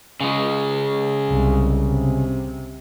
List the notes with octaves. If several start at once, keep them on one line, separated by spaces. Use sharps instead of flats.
C#3 G#3
C2
C3